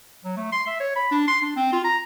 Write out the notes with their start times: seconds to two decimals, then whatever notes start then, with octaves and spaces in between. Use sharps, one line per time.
0.25 F#3
0.37 A3
0.52 C6
0.67 E5
0.80 C#5
0.96 B5
1.11 D4
1.28 C6
1.42 D4
1.56 C4
1.73 F4
1.84 A#5